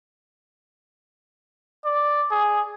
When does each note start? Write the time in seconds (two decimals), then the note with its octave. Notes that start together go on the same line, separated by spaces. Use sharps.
1.85 D5
2.31 G#4